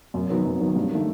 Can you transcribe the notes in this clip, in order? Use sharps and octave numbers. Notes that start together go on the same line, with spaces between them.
F#2
D#3 F#3 B3
F#2
D#3 F#3 B3
G2
D#3 A3